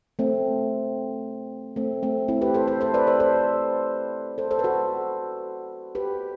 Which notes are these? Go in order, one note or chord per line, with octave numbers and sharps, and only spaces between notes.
A3 C4
A3 C4
A3 C4
C4 E4
G4 B4
A4 C5
A4 C5
A4 C5
B4 D5
A4 C5
A4 C5
A4 C5
A4 C5
B4
F#4 A4
G4 B4